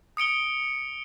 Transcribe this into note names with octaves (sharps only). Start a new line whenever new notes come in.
D#6 C#7 D7 G7